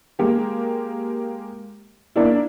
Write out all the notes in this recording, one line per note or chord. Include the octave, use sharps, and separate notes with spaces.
G#3 A#3 G4
A#3 D4 E4